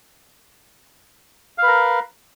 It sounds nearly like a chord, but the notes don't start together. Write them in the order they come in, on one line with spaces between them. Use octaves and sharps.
F5 B4 A#4